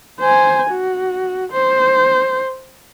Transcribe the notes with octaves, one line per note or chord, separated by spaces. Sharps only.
C5 G#5
F#4
C5